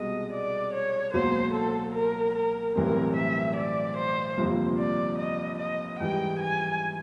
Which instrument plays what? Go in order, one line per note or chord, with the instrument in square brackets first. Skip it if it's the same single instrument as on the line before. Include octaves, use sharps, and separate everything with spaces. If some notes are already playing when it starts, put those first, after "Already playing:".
Already playing: [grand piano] C2 B2 G#3 [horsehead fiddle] D#5
[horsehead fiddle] D5
C#5
[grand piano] C#2 B2 F#3 A#3 [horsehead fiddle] C5
[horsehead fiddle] A4
A#4
A#4
[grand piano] B1 A2 E3 G3 C4 [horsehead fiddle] A#4
[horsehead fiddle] E5
D5
C5
[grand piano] G1 F2 C3 F3 A#3
[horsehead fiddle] D5
D#5
D#5
[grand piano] G#2 E3 G3 [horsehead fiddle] G5
[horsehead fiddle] G#5